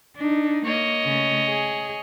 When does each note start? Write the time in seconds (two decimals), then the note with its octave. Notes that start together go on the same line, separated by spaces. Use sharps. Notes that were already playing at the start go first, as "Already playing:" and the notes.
0.17 D4 D#4
0.66 A#3 C#5 D#5
1.05 C#3 A3
1.49 G#4